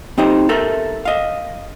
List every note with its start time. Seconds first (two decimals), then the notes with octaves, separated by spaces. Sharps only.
0.18 C4 D#4 G4 C5
0.49 A4 A#4 E5
1.05 D#5 F5